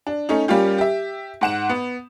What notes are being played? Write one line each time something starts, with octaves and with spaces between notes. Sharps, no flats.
D4
A3 C#4 D#4
G3 A#3 C#4 F4 G4
G4 E5
G#2 F#5 E7
B3